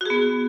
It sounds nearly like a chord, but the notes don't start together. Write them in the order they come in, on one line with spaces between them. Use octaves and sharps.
F#4 G#4 B3